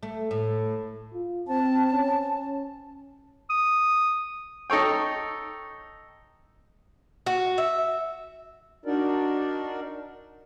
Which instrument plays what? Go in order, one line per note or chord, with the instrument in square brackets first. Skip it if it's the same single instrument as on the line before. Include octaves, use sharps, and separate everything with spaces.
[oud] A3
A2
[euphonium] F4
[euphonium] C4 [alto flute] A5
[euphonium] C#4
[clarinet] D#6
[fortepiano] D#4 A4 C#5 G5
[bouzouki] F#4
E5
[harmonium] D4 D#4 F#4 A#4 D5